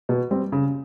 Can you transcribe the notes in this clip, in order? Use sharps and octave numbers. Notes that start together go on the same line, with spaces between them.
B2
G3 C4
C#3